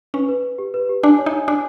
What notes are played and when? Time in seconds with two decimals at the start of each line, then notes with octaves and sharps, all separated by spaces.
0.14 C#4 B4
0.29 B4
0.44 B4
0.58 G4
0.74 B4
0.89 G4
1.03 D4 G#5
1.19 C#5
1.26 D#4
1.33 G#5
1.48 D4 G#5